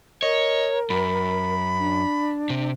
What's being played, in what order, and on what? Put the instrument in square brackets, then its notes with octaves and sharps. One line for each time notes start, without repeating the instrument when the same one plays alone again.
[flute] A#4 [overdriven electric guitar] C#5 [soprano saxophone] D#5
[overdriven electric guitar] F#2 [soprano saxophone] B5
[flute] D4
[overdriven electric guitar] C3